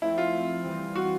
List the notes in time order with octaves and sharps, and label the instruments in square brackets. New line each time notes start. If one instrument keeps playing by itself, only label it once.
[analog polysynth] F3 A3 C4 [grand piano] E4
[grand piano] F4
[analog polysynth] E3 G3 C4
[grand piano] F#4